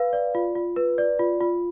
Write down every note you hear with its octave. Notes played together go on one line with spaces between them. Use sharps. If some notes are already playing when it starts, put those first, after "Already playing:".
Already playing: B4 F5
D5
F4
F4
B4
D5
F4
F4